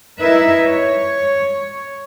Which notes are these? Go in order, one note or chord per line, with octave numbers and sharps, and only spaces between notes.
D#4 E4 A#4 B4 E5
C#5